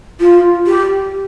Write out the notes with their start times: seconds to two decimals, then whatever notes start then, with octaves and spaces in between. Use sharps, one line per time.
0.21 F4
0.67 G4